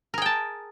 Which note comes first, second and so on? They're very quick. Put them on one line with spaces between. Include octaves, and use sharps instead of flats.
A#4 G#4 G5 A5